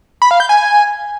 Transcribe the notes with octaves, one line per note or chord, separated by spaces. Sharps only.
B5
F5
G6
G#5